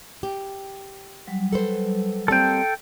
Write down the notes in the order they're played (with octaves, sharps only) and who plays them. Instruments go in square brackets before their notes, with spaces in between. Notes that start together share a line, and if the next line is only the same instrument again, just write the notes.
[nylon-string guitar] G4
[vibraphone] F#3 G3
[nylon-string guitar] A4 B4 C5
[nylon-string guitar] G3 A#3 C4 [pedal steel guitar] A4 G5